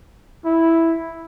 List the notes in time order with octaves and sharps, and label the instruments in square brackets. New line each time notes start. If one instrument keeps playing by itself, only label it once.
[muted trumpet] E4